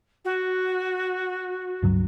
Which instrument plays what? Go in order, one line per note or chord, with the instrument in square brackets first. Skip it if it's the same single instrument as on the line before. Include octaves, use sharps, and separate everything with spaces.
[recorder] F#4
[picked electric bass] C#2 G2 F#3